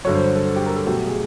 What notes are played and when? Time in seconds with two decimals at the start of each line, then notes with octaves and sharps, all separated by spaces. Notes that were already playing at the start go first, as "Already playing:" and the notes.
0.05 G2 D3 F#3 C#5
0.15 C5
0.35 A4
0.56 G4
0.66 A#4
0.76 A4
0.86 B2 F#3 A3 G4
1.07 G#4